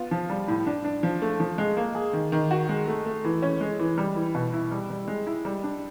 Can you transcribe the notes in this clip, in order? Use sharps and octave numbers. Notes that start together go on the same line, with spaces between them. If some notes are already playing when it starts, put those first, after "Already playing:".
Already playing: B3 F4
F3
G3
A2
D4
D4
F3
A3
F3
G#3
A#3
G#4
D#3
D#3
F#4
G#3
A3
A3
E3
C#4
G#3
E3
G3
E3
B2
E4
G3
G3
G#3
E4
G3
D4